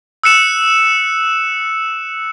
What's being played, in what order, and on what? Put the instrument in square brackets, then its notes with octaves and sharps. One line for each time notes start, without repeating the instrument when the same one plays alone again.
[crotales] E6 F#6 C#7 E7